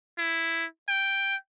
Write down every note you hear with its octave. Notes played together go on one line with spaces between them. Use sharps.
E4
G5